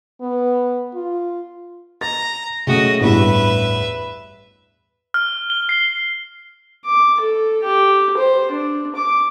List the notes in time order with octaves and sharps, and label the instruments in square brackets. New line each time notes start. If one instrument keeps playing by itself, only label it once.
[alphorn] B3
F4
[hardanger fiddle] A#5 [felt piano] A6
[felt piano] C#3 F#3 A3 [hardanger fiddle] F#4 D#5
[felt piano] A1 E2 G2 [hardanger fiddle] B4 E5
[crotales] F6
G7
C7
[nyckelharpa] D6
A4
G4
C5
D4
D6